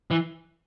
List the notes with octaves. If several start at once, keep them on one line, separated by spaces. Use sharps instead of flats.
E3